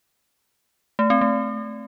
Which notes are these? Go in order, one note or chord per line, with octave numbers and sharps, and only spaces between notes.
A3
C4
A3